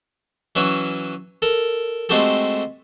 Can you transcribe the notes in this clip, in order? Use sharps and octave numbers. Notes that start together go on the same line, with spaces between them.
E3 F#3 C#4 E5
A4 A#4
G#3 A3 C4 F#4 G4 A4